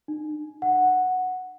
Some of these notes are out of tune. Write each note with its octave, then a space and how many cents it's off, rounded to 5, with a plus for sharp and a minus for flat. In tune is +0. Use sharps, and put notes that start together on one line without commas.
D#4 -40
F#5 -5